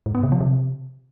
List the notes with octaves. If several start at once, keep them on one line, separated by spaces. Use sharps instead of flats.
G#2
B3
C3
F3
C3